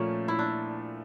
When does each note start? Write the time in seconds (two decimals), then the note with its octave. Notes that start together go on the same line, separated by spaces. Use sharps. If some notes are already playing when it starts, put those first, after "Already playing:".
Already playing: A#2 F3 A3 A#3 C#4
0.28 E4
0.39 D4